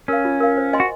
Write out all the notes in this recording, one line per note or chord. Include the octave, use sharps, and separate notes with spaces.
C#4 A#4 F5
F4
A#4 F5
C5
D#5 G#5 C6
F#4